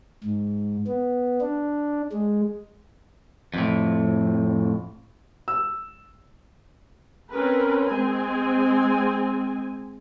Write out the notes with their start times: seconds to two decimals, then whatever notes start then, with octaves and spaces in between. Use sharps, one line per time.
0.24 G#2
0.87 B3
1.41 D4
2.12 G#3
3.54 F2 A2
5.48 E6
7.31 C4 C#4 A#4 B4
7.88 G#3 C4 G#5